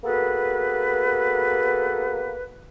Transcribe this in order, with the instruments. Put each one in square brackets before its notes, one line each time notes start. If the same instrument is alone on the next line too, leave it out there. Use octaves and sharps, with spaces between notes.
[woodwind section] A#3 B3 F#4 G#4 A4 B4